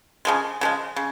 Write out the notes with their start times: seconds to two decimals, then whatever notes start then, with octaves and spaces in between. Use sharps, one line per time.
0.25 C#3 F3 G#3
0.61 C#3 F3 G#3
0.96 C#3